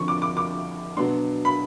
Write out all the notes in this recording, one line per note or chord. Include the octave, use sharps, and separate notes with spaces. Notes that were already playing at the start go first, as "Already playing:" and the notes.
Already playing: F2 D3 F3 C#6
D6
D6
D6
B2 F#3 B3 D4 C6
B5